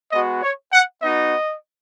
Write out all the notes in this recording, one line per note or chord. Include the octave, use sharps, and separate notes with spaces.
G#3 B3 F#4 D#5
C#5
F#5
B3 D#4 F#4 D#5